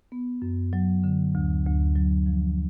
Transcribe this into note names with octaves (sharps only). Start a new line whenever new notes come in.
B3
F#2
F#3
D3
D2
D2
F#3
F3